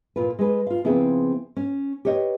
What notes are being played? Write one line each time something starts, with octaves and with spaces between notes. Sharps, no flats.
A#2 F4 B4
G#3 G#4 B4
F4 F5
C#3 F3 B3 C4 E4 G#4
C#4
G4 B4 C#5 D#5